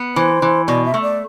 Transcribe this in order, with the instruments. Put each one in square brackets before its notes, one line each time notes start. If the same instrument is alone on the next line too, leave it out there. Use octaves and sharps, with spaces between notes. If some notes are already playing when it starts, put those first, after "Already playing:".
Already playing: [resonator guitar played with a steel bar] B3
[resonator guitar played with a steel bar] E3 [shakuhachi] C5
[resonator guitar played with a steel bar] E3
[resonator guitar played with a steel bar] B2 [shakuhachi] D5
[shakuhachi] E5
[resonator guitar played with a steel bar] A3
[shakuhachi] D5